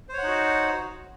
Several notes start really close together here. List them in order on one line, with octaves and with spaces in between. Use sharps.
C5 C#5 F#5 D#4 F#4